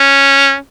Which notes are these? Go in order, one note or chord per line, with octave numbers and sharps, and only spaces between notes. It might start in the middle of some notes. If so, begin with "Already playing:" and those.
Already playing: C#4